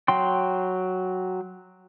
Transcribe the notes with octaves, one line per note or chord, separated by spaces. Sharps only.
F#3 G5 C6